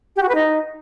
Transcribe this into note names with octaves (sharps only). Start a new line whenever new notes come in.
G4
F#4
B4
D#4